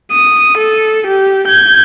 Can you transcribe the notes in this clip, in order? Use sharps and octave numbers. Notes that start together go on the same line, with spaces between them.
D#6
A4
G4
G6 G#6